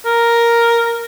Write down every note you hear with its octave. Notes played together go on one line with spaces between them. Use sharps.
A#4